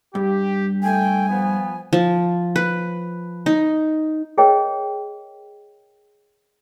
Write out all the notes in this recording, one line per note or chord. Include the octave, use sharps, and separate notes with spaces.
G2 G4
A3 G5 G#5
F3 B3
F3
B4
D#4
G#4 A#4 C#5 D#5 G5